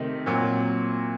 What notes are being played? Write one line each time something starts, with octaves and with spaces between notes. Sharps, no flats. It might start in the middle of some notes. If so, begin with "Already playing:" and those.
Already playing: C3 D#3 A3 C4 D#4
A#2 F#3 C4 F#4